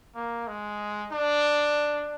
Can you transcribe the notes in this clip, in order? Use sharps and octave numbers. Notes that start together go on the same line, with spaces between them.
A#3
G#3
D4